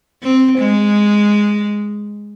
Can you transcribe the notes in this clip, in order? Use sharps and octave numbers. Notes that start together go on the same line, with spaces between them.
C4
G#3